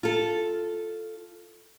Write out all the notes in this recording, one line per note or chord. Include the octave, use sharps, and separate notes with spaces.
F4 A4